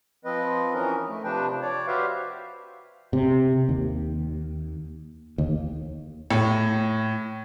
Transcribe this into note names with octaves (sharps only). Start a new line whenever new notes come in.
F3 C4 B4 D#5
E3 C#4 D#4 A#4
A3
C3 F3 D4 B4 G5
C#5 D5
F#4 G4 B4 C5 E5 F5
C3
D#2
D#2
A2